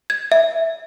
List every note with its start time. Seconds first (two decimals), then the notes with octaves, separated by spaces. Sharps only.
0.10 G#6
0.32 E5